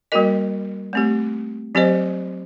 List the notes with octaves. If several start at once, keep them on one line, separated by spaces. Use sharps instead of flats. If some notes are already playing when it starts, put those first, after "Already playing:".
G3 A#3 F#4 A#4 D#5
A3 C4 G4
F#3 C4 G4 C5 D#5